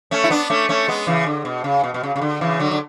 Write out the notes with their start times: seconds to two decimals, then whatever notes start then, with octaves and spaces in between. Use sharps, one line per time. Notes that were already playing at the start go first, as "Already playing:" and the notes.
0.11 A3 C#4
0.24 E4
0.30 B3 D4
0.50 A3 C#4
0.69 A3 C#4
0.88 G#3 B3
1.07 C#3 E3
1.26 D3
1.45 B2
1.64 C#3
1.83 B2
1.94 B2
2.03 C#3
2.16 C#3
2.21 D3
2.41 C#3 E3
2.60 D3 F#3
2.71 D3